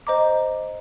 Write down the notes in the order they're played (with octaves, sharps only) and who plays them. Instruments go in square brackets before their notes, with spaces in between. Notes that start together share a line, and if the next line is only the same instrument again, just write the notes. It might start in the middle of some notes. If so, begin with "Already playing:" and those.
[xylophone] C5 D#5 A#5 D6